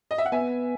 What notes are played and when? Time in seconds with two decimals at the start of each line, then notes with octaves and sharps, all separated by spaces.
0.11 D#5
0.18 E5
0.26 F#5
0.32 B3 E5 G#5